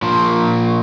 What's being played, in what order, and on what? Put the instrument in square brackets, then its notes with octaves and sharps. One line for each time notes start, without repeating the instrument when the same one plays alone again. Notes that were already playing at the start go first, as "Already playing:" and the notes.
[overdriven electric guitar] A#2 F3